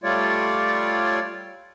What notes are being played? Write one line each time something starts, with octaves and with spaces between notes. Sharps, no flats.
G3 A3 F4 C#5 D5